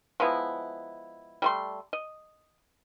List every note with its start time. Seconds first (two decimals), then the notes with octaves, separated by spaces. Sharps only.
0.20 F3 G#3 B3 E4
1.42 G3 A3 C6
1.93 D#5